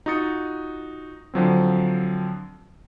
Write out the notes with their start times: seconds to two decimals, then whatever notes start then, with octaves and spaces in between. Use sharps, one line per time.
0.06 D#4 F4 F#4 D#6 A6 C#7
1.34 D3 F3 F#3 C4